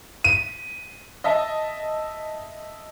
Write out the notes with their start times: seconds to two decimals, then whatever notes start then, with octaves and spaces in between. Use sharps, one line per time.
0.24 D#7
1.24 D#5 E5 A5